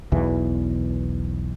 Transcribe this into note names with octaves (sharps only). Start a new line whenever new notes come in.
B1 E2 E3